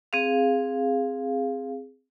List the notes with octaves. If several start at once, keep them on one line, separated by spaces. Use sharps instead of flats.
C4 G#4 F5